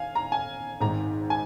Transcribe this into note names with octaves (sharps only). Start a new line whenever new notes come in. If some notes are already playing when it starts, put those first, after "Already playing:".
Already playing: F5 G#5
A#5
G#5
G#1 G#2 D#3 A#5
G#5